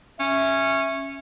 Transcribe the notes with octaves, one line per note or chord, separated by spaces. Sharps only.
C#4 E5